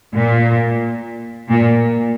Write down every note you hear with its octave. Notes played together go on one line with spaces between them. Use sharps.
A#2
A#2